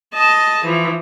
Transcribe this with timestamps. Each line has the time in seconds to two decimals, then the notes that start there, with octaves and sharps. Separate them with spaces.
0.14 D#5 A5
0.65 E3 F3